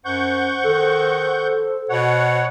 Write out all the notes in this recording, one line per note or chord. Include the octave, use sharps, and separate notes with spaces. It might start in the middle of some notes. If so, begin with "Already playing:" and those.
F#2 C5 F#5 C#6 G6
D#3 A4
B2 C#5 F#5